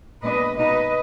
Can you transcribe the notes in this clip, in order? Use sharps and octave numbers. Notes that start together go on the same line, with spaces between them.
A#2 G#3 B3 D4 B4 D#5
B2 A#3 D#4 B4 D#5